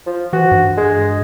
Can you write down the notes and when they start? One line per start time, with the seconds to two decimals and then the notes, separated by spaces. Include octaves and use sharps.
0.06 F3
0.33 E3 F#4
0.51 G2
0.77 G#3